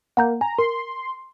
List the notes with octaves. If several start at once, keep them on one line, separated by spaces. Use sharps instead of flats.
A#3 F#5 A#5 G6
G#5 A#5
A#4 C6